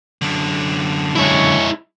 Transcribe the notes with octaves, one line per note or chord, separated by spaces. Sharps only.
F#2 D3
G#3 E4 C#5 G#5 C#6